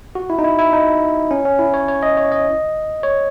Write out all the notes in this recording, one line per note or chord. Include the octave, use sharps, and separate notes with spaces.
F#4
E4
D#4
E4
E4
D#4
C#4
C#4
E4
C#5
C#5
D#5
C#5
D#5
C#5